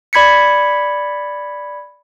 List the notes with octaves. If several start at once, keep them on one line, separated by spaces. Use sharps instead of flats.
D5 B5 G#6 B6 C#7